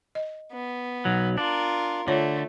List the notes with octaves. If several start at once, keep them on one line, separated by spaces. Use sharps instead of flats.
D#5
B3
B1 F#3
D4 F4 A#4
D3 A3 F4 C#5